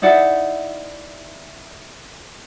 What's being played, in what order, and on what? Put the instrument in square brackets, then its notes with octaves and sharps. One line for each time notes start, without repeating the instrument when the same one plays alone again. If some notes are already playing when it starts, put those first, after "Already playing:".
[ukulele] D#4 E4 D5 F#5